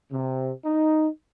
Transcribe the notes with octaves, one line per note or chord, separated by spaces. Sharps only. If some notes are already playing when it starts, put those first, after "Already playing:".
C3
D#4